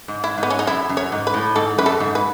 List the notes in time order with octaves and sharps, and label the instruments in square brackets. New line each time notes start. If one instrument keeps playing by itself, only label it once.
[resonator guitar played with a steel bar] G#2
[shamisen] E4
[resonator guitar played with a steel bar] G#2
[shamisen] B3
C#4
D#4
[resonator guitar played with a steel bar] F#2 [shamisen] E4
[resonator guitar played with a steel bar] F#2
[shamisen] C#5
[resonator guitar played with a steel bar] G#2
[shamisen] B4
[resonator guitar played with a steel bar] A2
[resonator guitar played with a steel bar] G#2 [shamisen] A4
[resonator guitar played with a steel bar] F#2 [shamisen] B4
[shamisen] A4
[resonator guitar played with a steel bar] G#2
[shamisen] B4